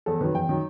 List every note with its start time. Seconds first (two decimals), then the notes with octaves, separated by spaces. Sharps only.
0.06 E2 A4
0.21 D#3 F#3 B4
0.35 E2 G5
0.49 D#3 F#3